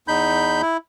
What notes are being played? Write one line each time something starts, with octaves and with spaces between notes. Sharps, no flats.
E2 D#4 B5 G6
E4